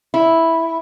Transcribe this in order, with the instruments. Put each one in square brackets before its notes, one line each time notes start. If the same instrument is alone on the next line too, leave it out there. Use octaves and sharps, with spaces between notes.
[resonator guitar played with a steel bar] E4